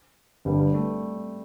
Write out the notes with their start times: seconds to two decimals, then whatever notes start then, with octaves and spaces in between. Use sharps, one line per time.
0.45 G1 G2 D3 G3
0.60 G3
0.74 A3